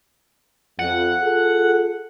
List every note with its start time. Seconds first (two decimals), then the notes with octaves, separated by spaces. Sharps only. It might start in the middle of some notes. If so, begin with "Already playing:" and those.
0.79 F2 F#5
1.22 F4 G#4 A4